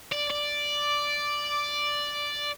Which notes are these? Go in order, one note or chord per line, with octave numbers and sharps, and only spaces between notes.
D5
D5